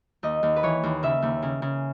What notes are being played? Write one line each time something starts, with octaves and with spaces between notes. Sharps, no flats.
D#2 D#5
D#2
B4
E3 C#5
D#2
C#3 E5
D#2
C#3
C#3